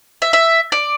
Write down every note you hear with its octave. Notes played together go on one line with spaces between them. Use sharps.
E5
E5
D5